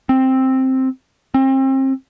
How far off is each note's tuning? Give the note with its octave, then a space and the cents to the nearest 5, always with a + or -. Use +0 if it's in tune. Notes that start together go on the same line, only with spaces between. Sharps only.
C4 +5
C4 +35